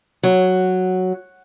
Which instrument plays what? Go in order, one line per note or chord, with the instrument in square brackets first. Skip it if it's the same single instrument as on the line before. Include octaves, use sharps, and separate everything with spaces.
[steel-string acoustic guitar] F#3